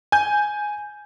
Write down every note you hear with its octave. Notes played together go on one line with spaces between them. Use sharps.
G#5 G6